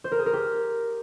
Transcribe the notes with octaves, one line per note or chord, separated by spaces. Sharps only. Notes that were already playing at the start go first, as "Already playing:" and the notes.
C5
A#4
G#4
A#4
G4